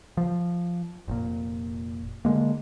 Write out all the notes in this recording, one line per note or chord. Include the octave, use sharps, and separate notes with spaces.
F3
F1 A#2
D3 G#3 A#3